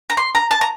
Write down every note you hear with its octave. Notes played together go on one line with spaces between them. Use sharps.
A#5
C6
A#5
A5
A#5